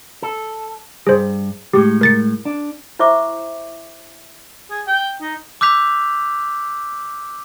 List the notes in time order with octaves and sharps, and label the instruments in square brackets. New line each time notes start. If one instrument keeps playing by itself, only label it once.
[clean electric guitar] A4
[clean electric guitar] G2 [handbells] G#4 C5
[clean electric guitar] A2 G#3 [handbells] G4
[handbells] A#4 A6 C#7
[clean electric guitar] D4
[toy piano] E4 C5 E5 C#6 D6
[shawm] G#4
G5
D#4
[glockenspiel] D6 E6 F#6 G6 B6 F7